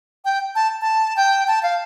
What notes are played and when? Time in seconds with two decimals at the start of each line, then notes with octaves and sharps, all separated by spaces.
0.25 G5
0.55 A5
0.81 A5
1.16 G5
1.48 A5
1.63 F5